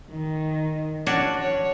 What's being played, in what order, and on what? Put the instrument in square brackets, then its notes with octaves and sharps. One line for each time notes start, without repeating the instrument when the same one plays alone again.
[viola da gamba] D#3
[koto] C#4 D4 F#4
[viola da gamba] C#5